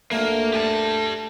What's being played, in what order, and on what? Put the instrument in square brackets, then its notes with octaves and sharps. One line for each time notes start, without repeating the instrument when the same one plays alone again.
[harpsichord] D2 A3 [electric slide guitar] A#3
[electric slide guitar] G4 G#5 A5